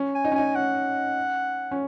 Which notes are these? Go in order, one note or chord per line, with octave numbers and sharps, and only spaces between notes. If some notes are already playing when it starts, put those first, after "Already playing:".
Already playing: C#4
G#5
D#4
C#4
D#4 G#5
C#4 F#5
C#4